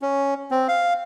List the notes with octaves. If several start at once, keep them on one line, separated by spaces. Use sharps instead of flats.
C#4
C4
F5